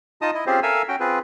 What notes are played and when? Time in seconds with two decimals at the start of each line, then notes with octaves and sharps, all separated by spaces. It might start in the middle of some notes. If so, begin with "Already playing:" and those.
0.22 D#4 F4 D#5 A5 D#6
0.34 E4 D#5
0.47 C4 C#4 F4 G4 G#4 C5
0.63 A4 A#4 E5 F5 G#5 E6
0.88 C#4 F#4 G5
1.00 C4 F4 G#4 B4